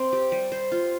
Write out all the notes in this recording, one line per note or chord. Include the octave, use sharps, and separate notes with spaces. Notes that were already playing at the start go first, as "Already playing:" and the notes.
Already playing: C4 C5
G4
G3
C5
F4